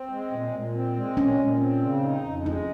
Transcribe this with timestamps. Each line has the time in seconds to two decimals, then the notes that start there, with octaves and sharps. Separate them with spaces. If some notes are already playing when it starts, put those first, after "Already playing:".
Already playing: C4
0.10 G#3
0.31 A#2
0.52 A#2
0.74 C4
0.96 G#3
1.17 A#2 C#4
1.38 A#2
1.59 C4
1.82 C#3
2.03 D#4
2.25 F2
2.45 G#3 D#4